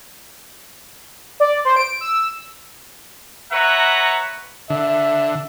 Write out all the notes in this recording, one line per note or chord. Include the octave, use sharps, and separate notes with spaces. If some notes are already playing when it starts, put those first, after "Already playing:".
D5
C5
D7
E6
B4 C#5 E5 F#5 A#5
D3 E5